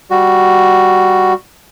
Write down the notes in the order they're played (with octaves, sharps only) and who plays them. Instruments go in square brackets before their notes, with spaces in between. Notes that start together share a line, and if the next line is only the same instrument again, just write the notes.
[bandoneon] G3 F#4